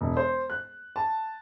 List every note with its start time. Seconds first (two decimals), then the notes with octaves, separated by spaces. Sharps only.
0.01 E1
0.17 C5
0.50 F#6
0.96 A5